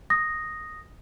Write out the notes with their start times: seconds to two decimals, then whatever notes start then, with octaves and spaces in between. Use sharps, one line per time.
0.10 D#6 A#6